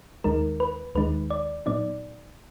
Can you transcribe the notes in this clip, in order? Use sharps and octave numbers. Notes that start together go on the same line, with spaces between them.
D#2 D#3 G#3 D#4 A#4
B4
D#2 D#3 G#3 D#4 B4
D5
A#2 F#3 B3 D#4 D5